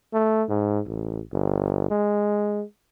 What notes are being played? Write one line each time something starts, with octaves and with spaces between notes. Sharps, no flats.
A3
G#2
A1
G1
G#3